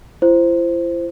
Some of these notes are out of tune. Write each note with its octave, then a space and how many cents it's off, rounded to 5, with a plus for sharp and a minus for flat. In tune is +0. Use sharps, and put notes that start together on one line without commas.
E4 +45 C5 +0